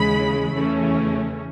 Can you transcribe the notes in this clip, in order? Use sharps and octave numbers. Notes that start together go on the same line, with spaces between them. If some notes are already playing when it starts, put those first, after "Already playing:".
Already playing: D#2 C#3 E3 G#3 B5
E2 C#3 E3 A3 C#4